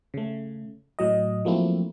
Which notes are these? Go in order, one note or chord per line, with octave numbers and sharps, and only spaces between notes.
C#3 A3
A2 F#3 D#5
F3 F#3 A3 A#3 C4 E4